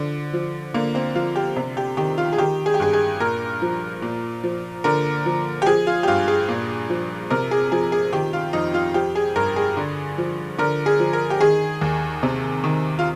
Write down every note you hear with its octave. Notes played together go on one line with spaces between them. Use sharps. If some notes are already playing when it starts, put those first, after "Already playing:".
Already playing: D3 F3
F3
D3 A#3
C4
F3 F4
G4
C3
G4
D#3 G4
F4
G#4
D#3 G4
G#4
G4
G2 G#4
G#4
A#2 A#4
F3
A#2
F3
D3 A#4
F3
G4
F3 G#4
F4
G4
G2 F4
G#4
A#2
F3
C3 A#4
G#4
F3 G#4
G#4
D#3 G4
F4
F2 D#4
F4
F3 G4
G#4
G2 A#4
G#4
D3
F3
D3 A#4
G#4
F3
A#4
G4
D#3 G#4
D#2
C3
D#3
F4